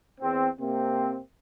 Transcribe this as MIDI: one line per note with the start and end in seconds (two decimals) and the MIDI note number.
0.21 0.48 40
0.21 0.48 60
0.61 1.19 48
0.61 1.19 58
0.61 1.19 60